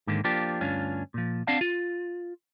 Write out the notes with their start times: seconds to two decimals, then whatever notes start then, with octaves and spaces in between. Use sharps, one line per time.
0.07 G#2 D3 D#3 A#3
0.24 F3 A#3 D4 F4 G4
0.61 D2 G2 C#4 D4 F4
1.14 A#2 F3
1.47 C4 D4 D5 F5 F#5 A5
1.61 F4